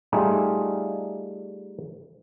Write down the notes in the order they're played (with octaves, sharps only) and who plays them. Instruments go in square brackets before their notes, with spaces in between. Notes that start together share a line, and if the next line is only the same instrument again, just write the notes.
[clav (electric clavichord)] G3 A3 D#4 F4 G#4